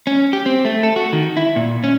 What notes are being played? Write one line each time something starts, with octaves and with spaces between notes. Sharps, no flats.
C#4
G4
C4
A3
A4
F#4
D#3
E4
A#2
C#4